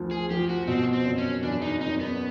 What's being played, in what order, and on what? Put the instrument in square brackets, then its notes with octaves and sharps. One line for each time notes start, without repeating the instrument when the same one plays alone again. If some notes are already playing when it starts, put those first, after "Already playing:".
Already playing: [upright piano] D2 F3
[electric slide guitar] G#4
[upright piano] F3 [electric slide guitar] G4
[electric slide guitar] F#4
[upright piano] B2 [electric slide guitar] C4
[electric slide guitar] C4
[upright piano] F#1
[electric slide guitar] C#4
[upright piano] E2 [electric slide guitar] D4
[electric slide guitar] D#4
[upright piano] F#1 [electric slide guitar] D#4
[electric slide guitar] B3